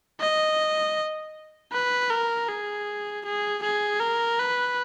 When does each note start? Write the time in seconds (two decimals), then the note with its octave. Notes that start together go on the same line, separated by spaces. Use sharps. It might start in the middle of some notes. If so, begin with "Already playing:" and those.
0.20 D#5
1.72 B4
2.10 A#4
2.48 G#4
3.25 G#4
3.62 G#4
4.00 A#4
4.39 B4